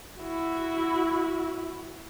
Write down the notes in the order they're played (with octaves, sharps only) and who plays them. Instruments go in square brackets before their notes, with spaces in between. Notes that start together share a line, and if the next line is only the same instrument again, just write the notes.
[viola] E4 F#4